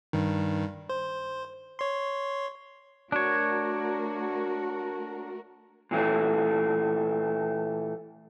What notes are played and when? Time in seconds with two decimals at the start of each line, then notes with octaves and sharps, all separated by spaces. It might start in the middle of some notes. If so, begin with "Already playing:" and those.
0.13 G2 D#3
0.89 C5
1.79 C#5 C6
3.12 A3 D4 F#4 A#4 C#5
5.91 A#2 E3 A3